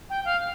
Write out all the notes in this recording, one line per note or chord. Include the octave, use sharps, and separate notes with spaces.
G5
F5